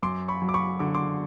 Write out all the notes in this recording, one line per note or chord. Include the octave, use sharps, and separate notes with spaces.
F#2 C6 D6
B5 C#6
F#3
D6
B5 C#6
D3 D6
C6 D6